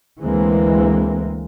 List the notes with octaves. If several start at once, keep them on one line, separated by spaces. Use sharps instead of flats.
D2 E3 G#3 A#3 C4